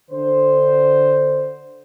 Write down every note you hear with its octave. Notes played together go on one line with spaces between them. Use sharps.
D3 C5